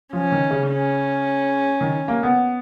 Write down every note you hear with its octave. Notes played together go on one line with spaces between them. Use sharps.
F3 C#4
D#3
C#3
C#4
D#3
A#3
B3